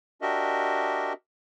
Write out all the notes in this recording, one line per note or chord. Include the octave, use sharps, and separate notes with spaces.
D4 F#4 G4 A#4 D#5 E5